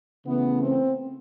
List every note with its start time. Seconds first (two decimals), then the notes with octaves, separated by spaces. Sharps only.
0.25 C#3 E3 A3 B3
0.61 C4